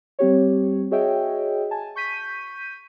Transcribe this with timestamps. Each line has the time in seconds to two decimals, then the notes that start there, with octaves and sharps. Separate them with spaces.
0.19 G3 C4 G4 C#5
0.91 F#4 G#4 C#5 D#5 E5 G5
1.71 G#5 A5
1.96 C#6 G6 B6 D#7